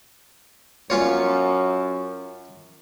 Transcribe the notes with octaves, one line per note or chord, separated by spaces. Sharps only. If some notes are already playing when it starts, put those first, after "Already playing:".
F#2 C#4 F4 C#5